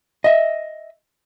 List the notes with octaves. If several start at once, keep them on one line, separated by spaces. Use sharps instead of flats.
D#5 E5